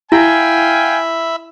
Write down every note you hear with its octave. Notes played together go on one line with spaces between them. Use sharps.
E4 E5 F5 G5 G#5 B5